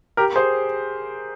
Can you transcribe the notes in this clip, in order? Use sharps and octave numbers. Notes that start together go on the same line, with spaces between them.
G4 A#4
G#4 C5